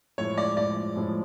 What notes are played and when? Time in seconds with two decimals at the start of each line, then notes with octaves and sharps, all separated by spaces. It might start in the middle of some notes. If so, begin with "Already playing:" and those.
0.18 A2 F3 G#3 C#5
0.37 D5
0.57 A2 F3 G#3 D5
0.96 A2 F3 G#3